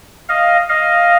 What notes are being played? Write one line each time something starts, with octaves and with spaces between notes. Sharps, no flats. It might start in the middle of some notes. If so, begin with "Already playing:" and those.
D#5 F5
D#5 F5